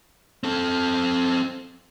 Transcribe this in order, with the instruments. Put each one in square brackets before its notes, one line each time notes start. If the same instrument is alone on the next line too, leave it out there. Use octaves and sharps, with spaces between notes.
[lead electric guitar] C4 A4